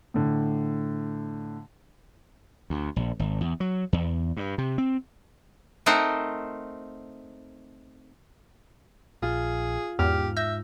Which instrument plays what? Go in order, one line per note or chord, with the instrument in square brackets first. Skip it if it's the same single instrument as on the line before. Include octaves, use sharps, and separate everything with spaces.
[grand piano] A2 D3
[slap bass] D2
A#1
G#1
E2
F#3
E2
G2
C3
C4
[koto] A3 C4 D#4 A#4 C5 F#5
[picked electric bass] A#1 [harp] F4 [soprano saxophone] G#4
[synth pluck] E2 [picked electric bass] G#2 [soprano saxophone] G4 [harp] F6
[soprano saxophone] E5 [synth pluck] E6 G6 A#6